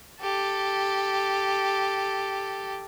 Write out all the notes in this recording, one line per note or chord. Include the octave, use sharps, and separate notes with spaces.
G4 A4